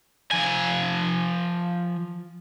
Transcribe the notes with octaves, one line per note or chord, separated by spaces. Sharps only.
F3 G#5